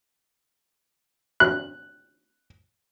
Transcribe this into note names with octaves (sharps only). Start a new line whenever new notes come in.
F#6